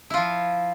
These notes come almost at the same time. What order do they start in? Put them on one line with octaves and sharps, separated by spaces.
E4 F4 F3